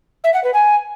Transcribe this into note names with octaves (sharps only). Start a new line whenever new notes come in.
E5
F#5
B4
G#5